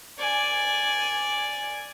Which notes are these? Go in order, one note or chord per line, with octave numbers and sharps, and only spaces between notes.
D5 G#5